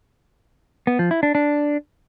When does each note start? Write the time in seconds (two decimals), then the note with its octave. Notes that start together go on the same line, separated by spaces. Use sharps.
0.87 B3
0.99 F3
1.11 E4
1.23 D4
1.35 D4